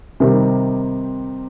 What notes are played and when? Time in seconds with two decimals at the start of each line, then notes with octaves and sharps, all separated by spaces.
0.20 C3 D#3 G3 C4